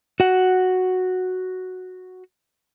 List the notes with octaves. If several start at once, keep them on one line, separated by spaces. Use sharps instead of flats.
F#4 F#5